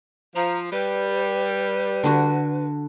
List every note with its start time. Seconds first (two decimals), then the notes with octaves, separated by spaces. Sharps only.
0.36 F3 A#5
0.72 G3 B4
2.04 D3 D4 F#4